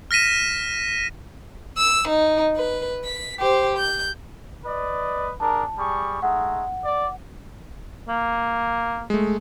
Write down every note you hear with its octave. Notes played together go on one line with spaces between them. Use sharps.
F6 A#6 B6 D#7 E7
E6
D#4
B4
B6
G4 C5
G6
B4 D5 D#5
D4 G#4 A#4 A5
G3 G#4 C#6
G#3 A3 D#4 F#5
D5
A#3
G#3 A3